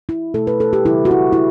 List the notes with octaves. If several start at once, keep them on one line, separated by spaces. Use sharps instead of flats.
E4
B2 A3 A4
B4
A4
G4
C#3 G3 E4
F#4
E4
E4